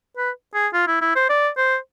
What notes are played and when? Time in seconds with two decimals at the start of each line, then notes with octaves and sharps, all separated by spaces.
0.17 B4
0.54 G#4
0.73 F4
0.87 E4
1.01 E4
1.15 C5
1.29 D5
1.57 C5